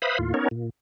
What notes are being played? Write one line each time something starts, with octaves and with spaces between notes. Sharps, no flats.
B4 C5 E5 F5 B5 D#6
D#2 A2 F4
B3 C#4 D#4 A#4 C#5
A#2